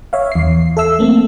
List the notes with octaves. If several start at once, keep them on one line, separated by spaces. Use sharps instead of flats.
C#5 E5 F5
E2 C7
A4 E5 E6
A3 A#3 C4